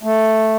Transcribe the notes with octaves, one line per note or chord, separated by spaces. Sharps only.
A3